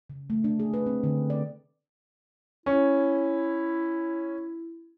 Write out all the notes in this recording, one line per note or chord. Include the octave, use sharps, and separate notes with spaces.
C#3
A3
D4
G#4
B4
C4
D3
D5
C#4 E4